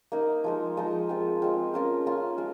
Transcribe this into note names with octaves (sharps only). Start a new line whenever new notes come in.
A#3 D#4 A#4 D#5
F3 G#3 D#4
F3 G#3 D#4
G#3 C4 F4
G#3 C4 F4
A#3 C#4 F4 A#4
A#3 C#4 F4 A#4
G#3 F4